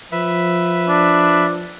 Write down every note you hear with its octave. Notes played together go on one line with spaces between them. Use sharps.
F3 B4 E5
D4